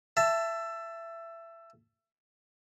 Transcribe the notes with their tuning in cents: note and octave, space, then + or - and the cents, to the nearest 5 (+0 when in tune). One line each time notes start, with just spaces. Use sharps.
E5 +20 A5 +0